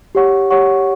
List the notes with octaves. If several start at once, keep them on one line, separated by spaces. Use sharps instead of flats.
G4 C#5 F#5 C#6
G4 C#5 F#5 C#6